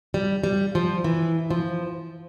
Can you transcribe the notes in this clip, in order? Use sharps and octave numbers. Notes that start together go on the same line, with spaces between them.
G3
G3
F3
E3
F3